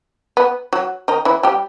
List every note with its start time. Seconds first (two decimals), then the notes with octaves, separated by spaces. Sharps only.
0.37 B3
0.73 F#3 F#4
1.08 D#3 D#4
1.25 E3 E4
1.43 G3 G4